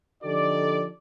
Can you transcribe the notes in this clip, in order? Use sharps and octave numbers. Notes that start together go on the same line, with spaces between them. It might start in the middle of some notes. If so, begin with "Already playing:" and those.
D3 F3 D#4 G4 A4 D5